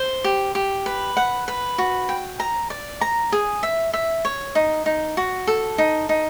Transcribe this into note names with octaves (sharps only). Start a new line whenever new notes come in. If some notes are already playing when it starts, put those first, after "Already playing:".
Already playing: C5
G4
G4
B4
F#5
B4
F#4
G5
A#5
D5
A#5
G#4
E5
E5
C#5
D#4
D#4
F#4
A4
D#4
D#4